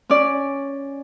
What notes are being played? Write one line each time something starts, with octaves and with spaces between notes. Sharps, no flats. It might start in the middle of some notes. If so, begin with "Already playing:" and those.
C#4 D5